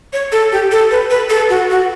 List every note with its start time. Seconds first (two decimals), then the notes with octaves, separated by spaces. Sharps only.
0.13 C#5
0.32 A4
0.52 G4
0.72 A4
0.91 B4
1.10 B4
1.30 A4
1.50 F#4
1.70 F#4